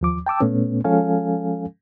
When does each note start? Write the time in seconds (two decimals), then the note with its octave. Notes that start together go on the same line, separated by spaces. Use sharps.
0.01 D#2 F3 D6
0.27 G5 A5 D6 E6
0.41 A#2 A3 B3 C#4
0.84 F3 G#3 C#4 A4 F5 G#5